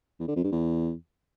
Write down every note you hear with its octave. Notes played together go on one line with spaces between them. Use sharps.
E2
D3
F2
G2
E2